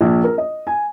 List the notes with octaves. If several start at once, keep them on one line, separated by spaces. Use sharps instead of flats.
A#1
A#4
D#5
G#5